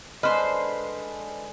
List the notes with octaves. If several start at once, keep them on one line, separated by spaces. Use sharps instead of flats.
D3 G#3 B4 C5 D#5 F6